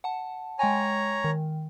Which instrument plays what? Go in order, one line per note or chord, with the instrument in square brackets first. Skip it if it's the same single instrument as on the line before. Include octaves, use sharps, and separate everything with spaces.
[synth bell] F#5 A5
[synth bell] G#3 G5 G#5 [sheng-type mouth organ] C#5 A#5
[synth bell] D#3